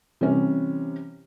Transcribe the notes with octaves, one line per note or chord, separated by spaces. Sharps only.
C3 E3 G3 C#4